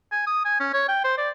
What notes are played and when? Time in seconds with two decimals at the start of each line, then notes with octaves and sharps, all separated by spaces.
0.12 G#5
0.27 D#6
0.45 G#5
0.60 C#4
0.74 C#5
0.89 G5
1.04 C5
1.18 D5